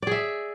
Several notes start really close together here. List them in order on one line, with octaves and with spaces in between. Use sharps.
D5 G#4 E5